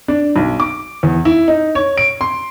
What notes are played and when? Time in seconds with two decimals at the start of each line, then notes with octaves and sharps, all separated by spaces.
0.08 D4
0.36 B1
0.60 D6
1.03 E2
1.25 E4
1.48 D#4
1.75 C#5
1.97 D7
2.21 C6